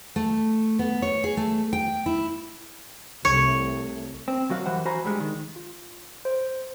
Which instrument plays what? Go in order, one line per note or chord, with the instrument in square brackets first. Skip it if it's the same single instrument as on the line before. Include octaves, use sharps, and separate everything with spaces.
[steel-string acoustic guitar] A3
B3
C#5
G#4
A3
G5
E4
[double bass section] C2 A3 [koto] C#5
[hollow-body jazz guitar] C4
F2 F#3 F#4 F5
F#2 E3 G3 C5 F#5
F#4 C5 F5 G#5 A#5 B5
G2 G3 G#3
D#3
[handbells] F4
C5